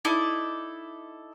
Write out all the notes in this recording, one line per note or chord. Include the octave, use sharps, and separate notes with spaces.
D#4 E4 A4 D5